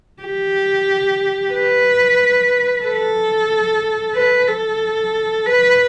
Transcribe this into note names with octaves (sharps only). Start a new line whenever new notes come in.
G4
B4
A4
B4
A4
B4